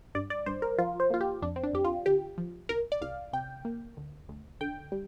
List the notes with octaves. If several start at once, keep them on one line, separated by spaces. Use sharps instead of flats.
G2 D5
D5
G2 C5
A#4
F3 F4
C5
A#3 F4
G4
F2 D4
C4
D4
F2 G4
F4
D3 G4
F3
C2 A#4
D5
C2 F5
C3 G5
A#3
D2
D2
D3 G5
G3